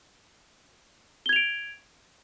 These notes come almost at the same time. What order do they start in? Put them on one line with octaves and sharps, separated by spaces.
G7 G#6 F7 D7